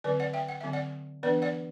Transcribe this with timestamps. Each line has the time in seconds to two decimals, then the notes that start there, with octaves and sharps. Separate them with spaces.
0.04 D3 F#3 C4 B4 D5
0.20 D5 F#5
0.33 E5 G5
0.49 F#5
0.61 D3 F#3 C4 E5
0.73 D5 F#5
1.23 E3 B3 D4 B4 D5
1.42 D5 F#5